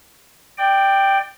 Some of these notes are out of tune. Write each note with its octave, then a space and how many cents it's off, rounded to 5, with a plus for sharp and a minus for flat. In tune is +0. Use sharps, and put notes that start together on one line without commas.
D5 +20 G5 +0